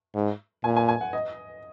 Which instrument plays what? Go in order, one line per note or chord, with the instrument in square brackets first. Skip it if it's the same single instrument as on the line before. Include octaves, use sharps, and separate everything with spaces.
[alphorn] G#2
[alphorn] A#2 [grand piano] G#5
[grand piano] G#5
G#5
F#5
D#5